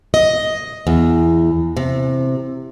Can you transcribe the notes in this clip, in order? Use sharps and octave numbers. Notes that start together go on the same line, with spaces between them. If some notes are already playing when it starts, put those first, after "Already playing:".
D#5
E2
C3